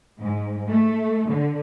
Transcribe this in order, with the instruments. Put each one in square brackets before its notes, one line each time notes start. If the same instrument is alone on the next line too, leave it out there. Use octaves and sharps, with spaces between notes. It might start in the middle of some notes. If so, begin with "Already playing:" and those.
[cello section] G#2
A3
D3